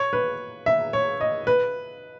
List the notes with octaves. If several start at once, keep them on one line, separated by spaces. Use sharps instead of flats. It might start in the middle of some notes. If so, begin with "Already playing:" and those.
Already playing: C#5
B4
E5
C#5
D#5
B4